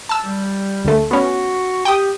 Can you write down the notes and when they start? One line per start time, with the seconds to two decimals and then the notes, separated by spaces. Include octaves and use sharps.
0.09 A5 E6
0.24 G3
0.85 D2 A3
1.11 B3 C#4 F#4 C#6
1.85 G4 G5 D#6